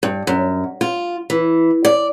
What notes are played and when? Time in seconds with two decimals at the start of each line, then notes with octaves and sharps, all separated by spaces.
0.03 G2
0.27 F#2
0.81 F4
1.30 E3
1.85 D5